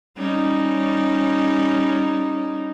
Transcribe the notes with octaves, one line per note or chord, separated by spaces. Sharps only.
G3 C#4 D#4